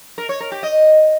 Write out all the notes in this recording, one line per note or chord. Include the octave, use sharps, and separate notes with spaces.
A#4
C#5
A#4
G4
D#5